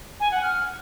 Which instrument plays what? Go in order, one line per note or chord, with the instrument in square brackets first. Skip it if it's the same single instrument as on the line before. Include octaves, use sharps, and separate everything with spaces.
[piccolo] G#5
F#5
F6